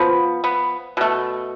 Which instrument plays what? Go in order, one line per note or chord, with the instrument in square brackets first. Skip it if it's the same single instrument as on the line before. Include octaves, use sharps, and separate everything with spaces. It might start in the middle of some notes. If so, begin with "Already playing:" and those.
Already playing: [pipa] F3 B3
B3
B2 A3